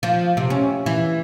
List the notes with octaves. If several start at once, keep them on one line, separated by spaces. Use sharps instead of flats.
F3
C3
C#4
E3